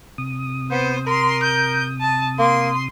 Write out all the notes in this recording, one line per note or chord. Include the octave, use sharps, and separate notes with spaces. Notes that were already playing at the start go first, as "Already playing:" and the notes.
C3 D#6
B3 C5
A#4 C6
G6
A5
A#3 C6